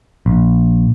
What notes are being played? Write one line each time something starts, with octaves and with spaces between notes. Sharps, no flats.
A#1